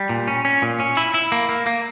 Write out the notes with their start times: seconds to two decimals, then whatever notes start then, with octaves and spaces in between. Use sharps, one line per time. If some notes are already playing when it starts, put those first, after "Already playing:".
Already playing: G3
0.09 A#2
0.27 C#4
0.45 C#4
0.62 A#2
0.80 C#4
0.97 E4
1.14 E4
1.32 A#3
1.49 A#3
1.67 A#3